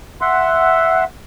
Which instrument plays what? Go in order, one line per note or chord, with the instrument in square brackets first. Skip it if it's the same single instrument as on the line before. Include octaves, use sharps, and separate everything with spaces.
[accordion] E5 F#5 C6